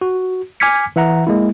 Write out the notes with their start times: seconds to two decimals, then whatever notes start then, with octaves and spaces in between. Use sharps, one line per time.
0.01 F#4
0.60 G#5 D6 F6 G#6 B6 C#7
0.96 E3 E5 F#5 A#5
1.27 G#3 A#3 E4